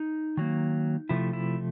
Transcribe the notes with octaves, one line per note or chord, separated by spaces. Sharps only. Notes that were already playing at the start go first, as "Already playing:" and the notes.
Already playing: D#4
D#3 F#3 A#3
C3 F3 A3 E4
E4